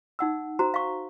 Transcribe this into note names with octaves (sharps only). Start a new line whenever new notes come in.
D#4 F#5 E6
F#4 C5 A#5
F5 C#6